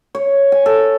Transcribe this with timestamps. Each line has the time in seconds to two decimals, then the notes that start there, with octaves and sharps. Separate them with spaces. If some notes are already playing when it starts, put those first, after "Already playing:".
0.15 C#5
0.52 G#5
0.66 A4